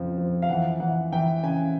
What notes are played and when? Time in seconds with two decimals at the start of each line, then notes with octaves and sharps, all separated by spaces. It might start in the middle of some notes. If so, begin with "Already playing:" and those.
Already playing: F2 C#3 F3
0.18 F3
0.42 F5
0.49 E3 F#5
0.80 E3 F#5
1.12 E3 G5
1.43 C#3 G#5